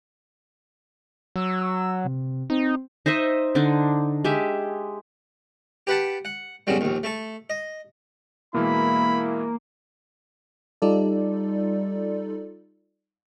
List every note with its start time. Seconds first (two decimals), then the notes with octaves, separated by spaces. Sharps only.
1.36 F#3 E6
2.04 C3
2.50 C4 D#4
3.06 D#4 C5 D#5 E5
3.55 D3 D4 D#4
4.24 G#3 G4 E5
5.87 G4 B4 F#5 A5
6.25 F#5
6.67 B1 F#2 C#3 F#3 G3
6.81 A#1 D#2
7.03 A3 A4
7.50 D#5
8.54 B2 E3 G#3 A#3 E4 B5
10.82 G3 D#4 F4 A4 D5